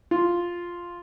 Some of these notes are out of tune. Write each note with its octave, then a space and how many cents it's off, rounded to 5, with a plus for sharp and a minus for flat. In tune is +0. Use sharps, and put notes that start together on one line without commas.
F4 +0